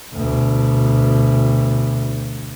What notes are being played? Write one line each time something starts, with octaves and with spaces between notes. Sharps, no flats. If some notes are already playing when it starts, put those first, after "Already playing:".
D2 B2